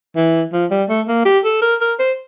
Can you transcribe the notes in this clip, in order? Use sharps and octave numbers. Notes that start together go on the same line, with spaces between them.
E3
F3
G3
A3
A#3
G4
A4
A#4
A#4
C5